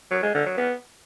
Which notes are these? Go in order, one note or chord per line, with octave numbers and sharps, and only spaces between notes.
F#3
G#3
D3
F#3
B3